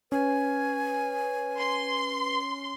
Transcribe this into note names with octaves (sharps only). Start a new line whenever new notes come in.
C#4 B4 G#5
C6